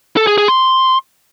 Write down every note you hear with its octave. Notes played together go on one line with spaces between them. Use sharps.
A4
G#4
G#4
C6